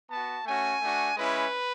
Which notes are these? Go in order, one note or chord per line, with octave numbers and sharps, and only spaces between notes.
B3 F#4 A5
A3 C#4 F#4 G#5
A3 D4 F#4
G#3 C#4 E4 B4